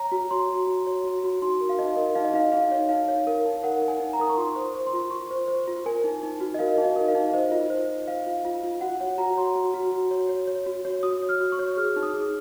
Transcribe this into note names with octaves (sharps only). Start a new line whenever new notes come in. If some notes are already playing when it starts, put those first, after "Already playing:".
Already playing: C#5 A#5
F#4
C#5 C6
F#4
F#4
C#5
F#4
F#4
D#4 C6
A#4
F5
D#4 D#5
A#4
D#4 F5
D#5
D#4 F5
D#4 F5
C#5
D#4 F5
C#5
A#4
D#4
A#4 F#5
A#4
G#5
D#4
A#5
A#4 D#6
C#6
F4 C6
C5
C5
C6
F4
F4 C#6
C5
C5
F4
A#4 G#5
D#4
D#4
F#4
D#5
A#4 F5
D#4
D#5
A#4
F5
D#4
C5 D#5
F4
C5
F4
C5 F5
F4
F4
F4
F#4 F#5
C#5 F#5
F#4 A#5
C#5 C6
F#4
F#4
F#4
C#5
C#5
C#5
F#4
C#5
F#4 D#6
C#5
F6
F#4
C#6
C#5
G#4 F6
D#4
D#6
G#4